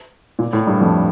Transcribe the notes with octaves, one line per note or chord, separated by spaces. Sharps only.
A#2
A2
G2
F2